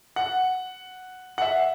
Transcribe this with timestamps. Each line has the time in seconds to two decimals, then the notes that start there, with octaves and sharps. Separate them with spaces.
0.16 F#5
1.38 F#5
1.42 E5